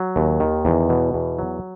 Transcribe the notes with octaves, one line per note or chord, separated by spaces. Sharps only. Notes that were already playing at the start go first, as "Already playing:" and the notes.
Already playing: F#3
D#2
D#3
E2
B2
E2
F#3